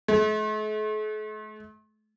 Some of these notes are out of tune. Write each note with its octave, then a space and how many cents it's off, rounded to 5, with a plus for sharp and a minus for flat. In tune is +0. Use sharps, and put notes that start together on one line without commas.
A3 -45